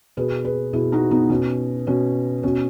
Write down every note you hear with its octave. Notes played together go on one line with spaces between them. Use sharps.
B2 G#4 B4
G#4 B4
B2 E4 G#4
D#4 F#4
B3 D#4
B2 C#4
B2 C#4
B2 C#4